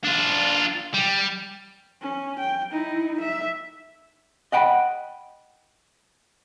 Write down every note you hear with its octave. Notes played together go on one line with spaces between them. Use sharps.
D4 F4
G3
C#4
G5
D#4 E4
E5
D#5 F#5 G5 B5